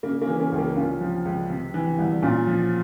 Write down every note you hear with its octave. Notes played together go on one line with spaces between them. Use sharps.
C#3 A#3
A#3 C#4
E3
A#3 C#4
C#2
A#3
C3 C#4 F4
F3
C#2
C3
E3
C2
A#2 C#4 F4
F3